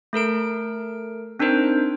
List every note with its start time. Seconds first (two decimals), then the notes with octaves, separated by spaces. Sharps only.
0.13 A3 A4 A#4 D7
1.39 C4 D4 D#4 A#4 C5